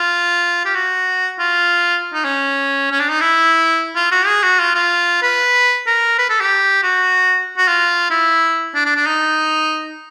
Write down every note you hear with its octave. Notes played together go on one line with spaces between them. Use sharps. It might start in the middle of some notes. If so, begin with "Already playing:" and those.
Already playing: F4
G4
F#4
F4
D#4
C#4
C#4
D4
D#4
E4
F4
F#4
G#4
F#4
F4
F4
B4
A#4
B4
A4
G4
F#4
F#4
F4
E4
D4
D4
D4
D#4